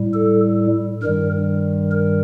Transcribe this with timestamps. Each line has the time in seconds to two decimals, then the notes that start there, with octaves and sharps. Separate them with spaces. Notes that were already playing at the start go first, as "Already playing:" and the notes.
Already playing: A2 G3
0.14 A4
1.02 G2 D#3 G3 A#4
1.91 A#4